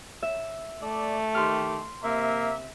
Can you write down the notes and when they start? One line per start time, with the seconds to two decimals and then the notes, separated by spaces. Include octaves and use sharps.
0.23 E5
0.82 A3 D5
1.35 D#3 G4 C6 F6
2.04 C3 A#3 E5